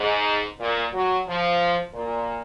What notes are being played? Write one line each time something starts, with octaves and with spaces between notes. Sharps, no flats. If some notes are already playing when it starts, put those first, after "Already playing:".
Already playing: G#2
A#2
F#3
F3
A#2